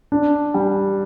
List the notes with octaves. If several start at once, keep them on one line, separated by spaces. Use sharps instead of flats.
D4
G3